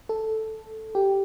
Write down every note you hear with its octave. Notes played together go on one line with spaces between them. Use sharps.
A4
G4